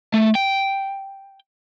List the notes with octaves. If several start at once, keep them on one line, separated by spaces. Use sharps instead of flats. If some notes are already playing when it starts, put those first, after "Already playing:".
A3
G5